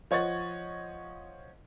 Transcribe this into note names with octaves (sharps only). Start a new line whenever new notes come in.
F3 C#5 D#5 F#5 A6